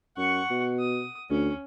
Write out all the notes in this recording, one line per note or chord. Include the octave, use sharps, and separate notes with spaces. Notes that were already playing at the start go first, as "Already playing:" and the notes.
F#2 F#5 C#6
B2
D#6
D2 C#4